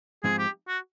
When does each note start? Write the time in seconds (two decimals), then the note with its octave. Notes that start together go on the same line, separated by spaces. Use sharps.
0.24 G#2 F3 G#3 C4 D#4 G#4
0.39 G4
0.68 F#4